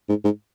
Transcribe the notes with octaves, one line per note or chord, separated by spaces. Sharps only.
G#2
G#2